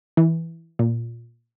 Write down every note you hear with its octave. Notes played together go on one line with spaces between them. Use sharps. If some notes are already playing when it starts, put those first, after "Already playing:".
E3
A#2